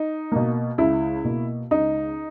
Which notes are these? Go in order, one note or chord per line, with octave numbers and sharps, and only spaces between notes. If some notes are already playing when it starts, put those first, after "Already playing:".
Already playing: D#4
B2 A#3
C#2 E4
B2 A#3
C#2 D#4